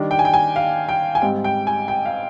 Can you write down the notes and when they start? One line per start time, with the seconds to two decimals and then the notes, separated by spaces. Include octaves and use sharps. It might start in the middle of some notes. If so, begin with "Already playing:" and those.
Already playing: D#3 G3 D4
0.11 G5
0.19 G#5
0.25 G5
0.34 G#5
0.56 F5
0.89 G5
1.15 G#5
1.22 G#2 G3 C4 G5
1.44 G5
1.67 G#5
1.88 G5
2.05 F5